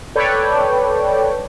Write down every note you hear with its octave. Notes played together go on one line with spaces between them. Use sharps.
A4 B4 C#5 D5 G5